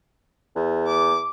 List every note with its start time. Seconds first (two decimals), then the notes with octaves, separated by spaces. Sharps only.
0.56 E2
0.87 D6